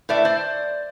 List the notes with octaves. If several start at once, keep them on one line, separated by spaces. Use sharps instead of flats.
A2 B4 D5 E5
C5 D5